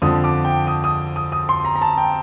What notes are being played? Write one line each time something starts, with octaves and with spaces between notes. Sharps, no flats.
F2 D3 F3 D#6
D6
G5
D#6
D#6
D#6
D#6
C6
A#5
A#5
A5
G5